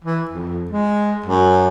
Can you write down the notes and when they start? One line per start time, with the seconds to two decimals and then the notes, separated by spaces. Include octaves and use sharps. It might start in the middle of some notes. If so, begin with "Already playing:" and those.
0.04 E3
0.30 F2
0.71 G#3
1.26 F#2